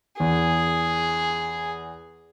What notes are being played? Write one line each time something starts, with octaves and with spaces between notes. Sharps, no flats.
E2 G#4